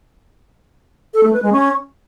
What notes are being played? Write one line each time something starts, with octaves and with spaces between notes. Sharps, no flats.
A4
A3
B4
G#3
C#4